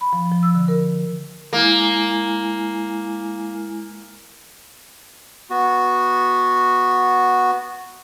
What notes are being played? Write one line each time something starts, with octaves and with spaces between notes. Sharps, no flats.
B5
F3
F3
E6
D3
A#4
G#3 A#3 E4 G#5
B3 F#4